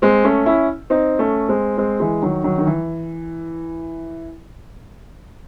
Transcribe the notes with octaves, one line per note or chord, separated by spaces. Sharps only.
G#3 C4
A3 C#4
C#4 E4
C4 D#4
A3 C#4
G#3 C4
G#3 C4
E3 G#3
D#3 F#3
D#3 F#3
D#3
E3